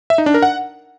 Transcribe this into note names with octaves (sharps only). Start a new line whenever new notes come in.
E5
D#4
D4
A#4
F#5